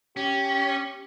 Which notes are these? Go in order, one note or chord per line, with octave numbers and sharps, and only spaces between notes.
C#4 G4